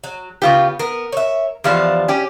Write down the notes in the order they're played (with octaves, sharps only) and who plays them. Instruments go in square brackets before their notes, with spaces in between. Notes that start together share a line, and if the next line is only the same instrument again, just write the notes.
[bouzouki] F#3
[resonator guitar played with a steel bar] C#3 F4 G4 [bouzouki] B3
[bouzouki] B3 [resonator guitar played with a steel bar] A#4
[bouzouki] C#5 E5
[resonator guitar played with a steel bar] E2 F3 [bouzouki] G3 D4 F5
[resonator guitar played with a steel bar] C#4 G4